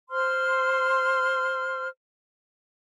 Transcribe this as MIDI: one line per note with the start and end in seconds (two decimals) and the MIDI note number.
0.09 1.87 72
0.09 1.87 84
0.09 1.87 89